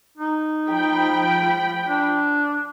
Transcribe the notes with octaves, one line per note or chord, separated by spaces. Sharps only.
D#4
F3 G5 B5
D4